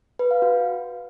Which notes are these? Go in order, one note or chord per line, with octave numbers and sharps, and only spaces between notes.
B4
F5
F#4